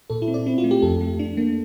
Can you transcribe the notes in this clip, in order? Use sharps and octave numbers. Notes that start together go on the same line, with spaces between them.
A#2 A4
E4
C4
D5
C4 E4
F4
A3
G4
F2 A4
A3
D4
A#3